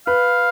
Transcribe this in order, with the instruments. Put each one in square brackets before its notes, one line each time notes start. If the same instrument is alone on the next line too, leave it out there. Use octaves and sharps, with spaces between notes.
[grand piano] B4 [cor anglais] F5